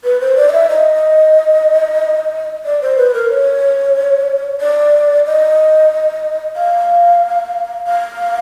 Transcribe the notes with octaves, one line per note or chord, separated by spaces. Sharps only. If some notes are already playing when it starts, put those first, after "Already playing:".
B4
C5
D5
D#5
E5
D#5
D5
C5
B4
A#4
C#5
D5
D#5
F5
F5